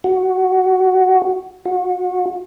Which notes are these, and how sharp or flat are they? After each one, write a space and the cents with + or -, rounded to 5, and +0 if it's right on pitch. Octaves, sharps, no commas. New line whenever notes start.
F#4 +10
F#4 -30